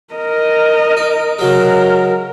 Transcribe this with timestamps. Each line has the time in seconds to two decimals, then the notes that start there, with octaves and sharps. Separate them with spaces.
0.14 A#4 D#5
0.97 D#4
1.39 C#3 F#3 G#3 A#4